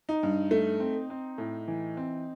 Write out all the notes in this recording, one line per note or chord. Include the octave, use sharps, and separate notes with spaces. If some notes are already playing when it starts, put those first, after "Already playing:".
D#4
G2
A3
C4
C4
A2
E3
C4